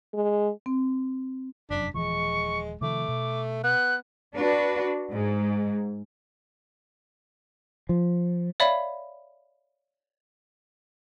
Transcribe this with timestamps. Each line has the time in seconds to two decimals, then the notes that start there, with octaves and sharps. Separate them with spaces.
0.14 G#3
0.66 C4
1.70 F1 F#2 D4 B6
1.94 D#1 E3 F3 G#3 C#6
2.81 C3 D#3 F3 A3 D6
3.09 B2
3.64 B3 F#6
4.35 D4 F#4 B4
5.11 G#2
7.89 F3
8.60 C#5 D5 E5 F5 B5